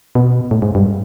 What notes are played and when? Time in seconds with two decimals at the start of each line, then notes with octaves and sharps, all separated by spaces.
0.15 B2
0.51 A2
0.62 G#2
0.75 G2